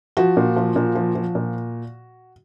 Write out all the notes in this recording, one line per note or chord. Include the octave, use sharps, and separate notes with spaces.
F3 F#4
A#2
F3
A#2
F3
F3
A#2